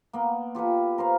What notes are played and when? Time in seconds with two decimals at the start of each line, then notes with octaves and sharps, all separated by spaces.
0.13 A#3 B3
0.55 F4 G4 A4 B4
0.98 A#4 C5 F5